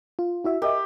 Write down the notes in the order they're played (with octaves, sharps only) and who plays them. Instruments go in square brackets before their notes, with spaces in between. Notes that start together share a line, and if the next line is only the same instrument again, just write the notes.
[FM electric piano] F4
E4 F#4 E5
[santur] G4 [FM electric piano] A#4 D#5 E5